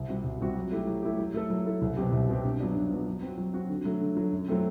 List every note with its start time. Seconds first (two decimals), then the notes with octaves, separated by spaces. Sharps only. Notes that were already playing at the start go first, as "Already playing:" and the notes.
Already playing: C2
0.08 C3 G3 C4 F#4
0.24 C2
0.40 C3 G3 C4 F#4
0.56 F#3
0.72 A3 E4 G4
0.87 F#3
1.03 A3 E4 G4
1.19 F#3
1.34 A3 E4 A4
1.50 F#3
1.66 A3 E4 A4
1.82 C2
1.97 B2 F#3 C4 G4
2.13 C2
2.29 B2 F#3 C4 G4
2.44 G2
2.60 F#3 B3 D4
2.76 G2
2.91 F#3 B3 D4
3.07 F#3
3.23 C4 F#4
3.38 F#3
3.54 C4 F#4
3.70 D3
3.85 F#3 A3
4.01 D3
4.17 F#3 A3
4.32 F#2
4.48 F#3 A3 C4